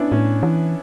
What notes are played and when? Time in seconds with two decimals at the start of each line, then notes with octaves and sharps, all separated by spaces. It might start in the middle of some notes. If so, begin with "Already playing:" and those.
Already playing: B3 C#4 D4 E4
0.12 A2 C#4
0.43 E3